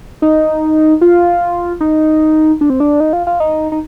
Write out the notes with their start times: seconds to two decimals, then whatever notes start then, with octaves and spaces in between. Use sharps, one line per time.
0.22 D#4
1.01 F4
1.80 D#4
2.61 D4
2.70 C4
2.80 D4
3.00 D#4
3.13 F4
3.27 F4
3.40 D#4
3.72 D#4